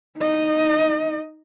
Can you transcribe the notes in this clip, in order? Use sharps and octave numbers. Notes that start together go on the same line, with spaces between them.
D#4 D#5